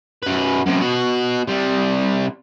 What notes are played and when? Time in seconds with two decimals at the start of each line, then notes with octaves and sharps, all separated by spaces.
0.23 F#2 B4
0.66 F#2 C3
0.81 B2 F#4
1.47 C3 G3